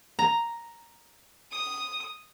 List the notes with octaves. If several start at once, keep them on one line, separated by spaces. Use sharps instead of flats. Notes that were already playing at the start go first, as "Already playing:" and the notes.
A#5
D#6